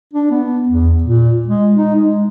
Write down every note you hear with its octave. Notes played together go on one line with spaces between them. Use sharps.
D4
B3
E2
A#2
G#3
D#4
G#3